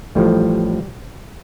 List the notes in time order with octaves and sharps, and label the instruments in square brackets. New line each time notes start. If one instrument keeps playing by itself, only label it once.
[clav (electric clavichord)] A1 A2 F3 G3